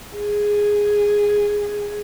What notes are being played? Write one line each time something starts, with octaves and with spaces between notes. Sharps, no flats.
G#4